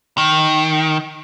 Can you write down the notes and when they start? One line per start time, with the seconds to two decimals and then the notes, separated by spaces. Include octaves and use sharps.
0.18 D#3